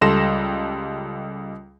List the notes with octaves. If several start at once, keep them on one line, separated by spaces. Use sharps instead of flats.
C#2 G3 A4 C6 A#6 E7